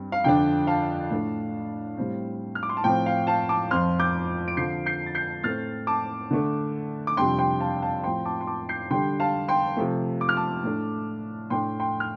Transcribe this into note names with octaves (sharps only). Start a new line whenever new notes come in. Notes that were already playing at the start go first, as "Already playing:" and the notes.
Already playing: G2 G3 C4
F5
F2 D3 F3 D4 G5
F5 A5
A2 A3 D4
A2 G3 C4
F6
D6
C6
A5
A2 F3 C4 G5
F5
F5 A5
A5 D6
F2 F3 C4 C6 F6
D6 G6
D7
D3 F3 C4 G6 C7
G6 C7
A6
G6 C7
A2 A3 C4 F6 A6
A5 D6
D3 A3 D4
D6
F2 C3 G3 D4 G5 C6
G5 C6
F5 A5
F5 A5
A2 F3 C4 G5 C6
A5 D6
C6
A5 D6
G6 C7
D3 G3 D4 G5 C6
F5 A5
G5 C6
C3 F3 A3
D6
F6
A5 D6
A2 A3 D4
A2 A3 D4 G5 C6
G5 C6
F6